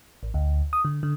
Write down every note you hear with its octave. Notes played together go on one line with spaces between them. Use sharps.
A1
D2
D#6
D3
D3